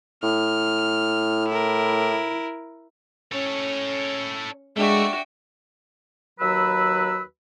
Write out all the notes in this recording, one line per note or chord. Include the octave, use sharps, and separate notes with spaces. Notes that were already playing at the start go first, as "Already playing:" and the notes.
A2 F6
E4 A#4
C#4 A4 C#5
G#3 A3 D4 F#4 E5 G5
D#2 F#3 F#4 B4 B5 E6